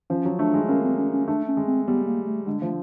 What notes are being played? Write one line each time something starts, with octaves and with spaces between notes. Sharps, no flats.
F3 C#4
F#3
A3 D4
G#3
A#3 C#4
C4
C#4
C#4
A3 D4
C#4
G#3
C4
G3 B3
A#3
A3
D3 G#3
F3 A3